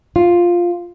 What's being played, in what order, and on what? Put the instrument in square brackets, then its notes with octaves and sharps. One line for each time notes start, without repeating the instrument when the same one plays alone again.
[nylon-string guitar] F4